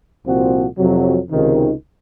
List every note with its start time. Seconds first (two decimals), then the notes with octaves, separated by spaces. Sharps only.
0.25 C2 A#2 F3 C4 F#4
0.77 F2 C3 F#3
1.30 C#2 C3 D#3